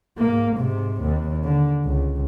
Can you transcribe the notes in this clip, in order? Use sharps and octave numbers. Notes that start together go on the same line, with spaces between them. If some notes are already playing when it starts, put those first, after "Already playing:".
G#2 A#3
G#2 C3
D#2
D3
C#2